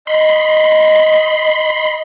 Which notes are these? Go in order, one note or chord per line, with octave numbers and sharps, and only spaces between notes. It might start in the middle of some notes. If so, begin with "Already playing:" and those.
D#5 B5 C6